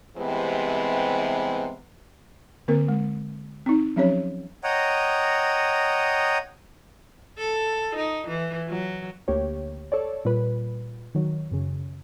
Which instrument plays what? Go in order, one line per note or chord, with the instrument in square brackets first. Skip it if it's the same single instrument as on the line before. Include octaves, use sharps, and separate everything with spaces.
[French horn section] C3 E3 G3 G#3 B3 C4
[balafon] D3 A#3 C4 A#4
G#3
C4 D#4
F3 F#3 C4 C#4 G4 C#5
[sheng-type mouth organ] C#5 D#5 F#5 G5 A#5 D#6
[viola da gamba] A4
D#4
E3
F#3
[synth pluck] D2 A#3 G4 C#5
A4 C#5 D5
A#2 G3 B4
D#3 F#3
F#2 C#3